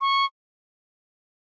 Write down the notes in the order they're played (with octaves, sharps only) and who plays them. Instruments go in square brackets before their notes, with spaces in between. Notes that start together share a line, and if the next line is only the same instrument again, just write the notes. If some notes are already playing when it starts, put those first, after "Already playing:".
[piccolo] C#6